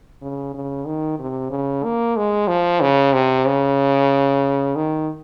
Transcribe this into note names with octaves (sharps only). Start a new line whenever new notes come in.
C#3
C#3
D#3
C3
C#3
A#3
G#3
F3
C#3
C3
C#3
D#3